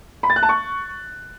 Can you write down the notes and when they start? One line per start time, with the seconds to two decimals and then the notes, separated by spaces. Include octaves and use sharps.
0.23 B5
0.30 A6
0.36 F#6
0.43 A5
0.49 C#6